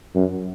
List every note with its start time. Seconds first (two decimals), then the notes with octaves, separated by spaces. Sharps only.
0.15 F#2